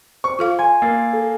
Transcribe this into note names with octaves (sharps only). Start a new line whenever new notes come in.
C5 C#6
F4 A4 F5
G#5 C6
A#3 E6 A6 C7
A4